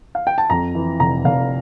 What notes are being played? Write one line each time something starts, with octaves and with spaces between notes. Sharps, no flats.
F5
G5
A5
F2 A#5
E3
F1 A#5
F1 F5